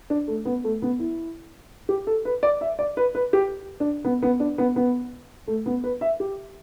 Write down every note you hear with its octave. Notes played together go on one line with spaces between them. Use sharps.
D4
A3
B3
A3
B3
E4
G4
A4
B4
D5
E5
D5
B4
B4
G4
D4
B3
B3
D4
B3
B3
A3
B3
B4
E5
G4